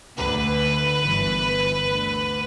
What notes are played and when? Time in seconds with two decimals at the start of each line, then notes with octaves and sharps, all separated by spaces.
0.17 D2 D3 B4
1.01 G1 G2 E3
1.84 D2 D3